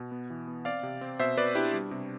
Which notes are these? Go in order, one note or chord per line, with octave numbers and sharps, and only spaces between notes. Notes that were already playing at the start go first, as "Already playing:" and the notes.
Already playing: B2
B3
E3
B3
C4 D5 F5
C3
C4
B2 C5 E5
B2 B4 D5
D4 E4 G4
G3
C3